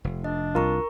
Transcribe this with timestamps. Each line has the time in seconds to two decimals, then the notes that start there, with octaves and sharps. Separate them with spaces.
0.04 F1
0.24 D4 D#5
0.55 C2 F4 A#4 A#5 C#6